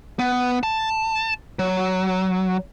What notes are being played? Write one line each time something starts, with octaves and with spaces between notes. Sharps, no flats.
B3
A5
F#3